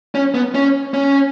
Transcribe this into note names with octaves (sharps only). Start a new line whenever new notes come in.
C#4
B3
C#4
C#4